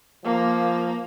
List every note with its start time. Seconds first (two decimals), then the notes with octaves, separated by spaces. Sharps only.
0.24 F3 A#3